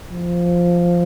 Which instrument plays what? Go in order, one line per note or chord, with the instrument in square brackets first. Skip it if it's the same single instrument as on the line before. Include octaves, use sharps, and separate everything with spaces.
[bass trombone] F3